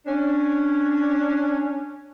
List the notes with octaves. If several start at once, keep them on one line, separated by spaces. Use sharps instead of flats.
C#4 D4